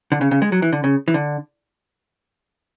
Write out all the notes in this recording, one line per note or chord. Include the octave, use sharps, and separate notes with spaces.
D3
C#3
C#3
G#3
F#3
E3
D3
C#3
E3
D3